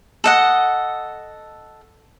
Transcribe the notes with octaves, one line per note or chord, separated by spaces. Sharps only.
A4 D#5 F#5